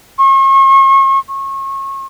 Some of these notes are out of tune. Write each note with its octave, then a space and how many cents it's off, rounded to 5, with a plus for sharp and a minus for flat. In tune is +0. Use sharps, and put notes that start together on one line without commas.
C#6 -40
C#6 -30